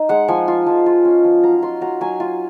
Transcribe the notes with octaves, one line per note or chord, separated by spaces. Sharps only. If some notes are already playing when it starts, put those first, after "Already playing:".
Already playing: D#4
G#3 F#5
F3 G#5
F4
F3
F4
C#4
F3
F#3 A#5
F4 C6
F#3 A#5
F#3 G#5
F4